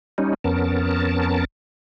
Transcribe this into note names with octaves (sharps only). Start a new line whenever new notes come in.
G3 C#4 D#4
F2 B3 C#4 A#4 A5